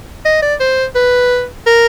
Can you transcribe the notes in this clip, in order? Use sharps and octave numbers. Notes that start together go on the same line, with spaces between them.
D#5
D5
C5
B4
A#4